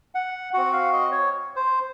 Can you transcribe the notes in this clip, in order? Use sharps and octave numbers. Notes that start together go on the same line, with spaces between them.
F#5
C4 F#4 F#5
F5
D#5
C#5
C5